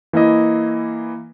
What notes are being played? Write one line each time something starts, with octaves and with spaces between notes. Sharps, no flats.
E3 A#3 E4 D#5